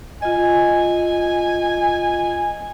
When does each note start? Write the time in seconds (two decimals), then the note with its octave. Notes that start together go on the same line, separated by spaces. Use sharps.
0.22 F4 D#5 G#5